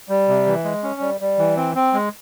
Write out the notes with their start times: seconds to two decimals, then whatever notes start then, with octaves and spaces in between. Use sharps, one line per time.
0.09 G3
0.28 C3
0.46 E3
0.64 G#3
0.83 C#4
1.01 G3
1.21 G3
1.39 E3
1.57 C4
1.75 C4
1.93 G#3